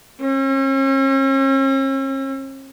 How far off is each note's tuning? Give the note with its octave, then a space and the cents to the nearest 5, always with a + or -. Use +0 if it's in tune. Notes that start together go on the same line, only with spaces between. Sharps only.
C#4 -45